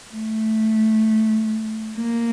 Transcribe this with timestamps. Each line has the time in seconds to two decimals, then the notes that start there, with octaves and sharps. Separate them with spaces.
0.12 A3
1.96 A#3